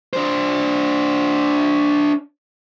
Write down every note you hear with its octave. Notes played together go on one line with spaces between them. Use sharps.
D4 C5